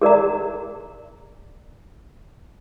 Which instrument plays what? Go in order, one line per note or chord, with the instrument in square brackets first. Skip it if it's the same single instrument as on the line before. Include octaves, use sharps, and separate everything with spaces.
[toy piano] G#4 A#4 D5 A#5